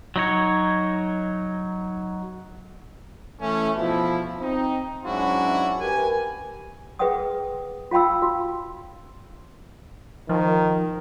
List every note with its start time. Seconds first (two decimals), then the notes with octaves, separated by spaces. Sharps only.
0.16 F#3 D#4 C#5
3.41 E3 A3 C#4
3.76 B2 F3 E4
4.40 C4 D#4
5.05 G#2 F#3 C#4 D4 E4 F#4
5.81 G4 A#4 B4 G#5
6.99 G#4 B4 E5 F#5 G5 D#6
7.91 F4 F5 G5 B5 E6
8.22 F#4
10.29 D#3 F3